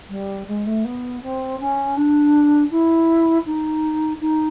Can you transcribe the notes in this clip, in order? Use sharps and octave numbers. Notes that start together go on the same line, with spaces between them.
G3
G#3
A3
B3
C4
C#4
D4
E4
D#4
D#4